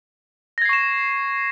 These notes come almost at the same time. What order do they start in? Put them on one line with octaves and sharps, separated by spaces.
A#6 G#6 C7 C#6 E7